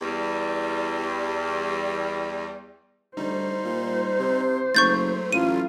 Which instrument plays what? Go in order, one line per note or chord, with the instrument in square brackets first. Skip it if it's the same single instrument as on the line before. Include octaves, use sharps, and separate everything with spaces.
[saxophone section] E2 G3
[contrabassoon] D2 [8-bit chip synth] G3 D#4 [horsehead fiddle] C5
[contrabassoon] A#2
C3
[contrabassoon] F#1 [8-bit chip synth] F#3 A3 [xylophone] C#6 G6 A6
[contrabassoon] A1 [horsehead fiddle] F4 [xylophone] D#7